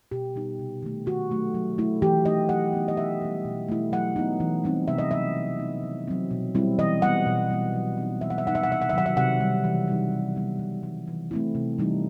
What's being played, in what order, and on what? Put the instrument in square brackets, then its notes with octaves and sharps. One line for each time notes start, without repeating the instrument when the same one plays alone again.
[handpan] B2 G4
G3 B3 D#4
C3
D#3 A3
D#3 F#4
F#3 A3
F#3
A3 E4
E3 G4
A3 D#4 D#5
F#3 F#5
B3 D#4
D#5
B2 E5
G3 B3
B2
A3 E4
F#3 F#5
B3 D#4
E3
G3 C4 D#4
C3 E5
D#5
F#3 A3 E5
E3
B3 D#4
D#3
F#3 C4
B2
G3 C4 E4
E3 D#5
G3 B3 F#5
B2
G3 B3
F#3
C4 D#4
E3 E5
F#5
E5
G3 D#4 F#5
E5
F#5
C3 E5
F#5
E5
D#3 F#3 F#5
E5
C3 F#5
D#3 G3
E3
G3 D#4
E3
G3 B3 D#4
C3
E3 G3
E3
A3 C4 E4
C3
E3 G3 D#4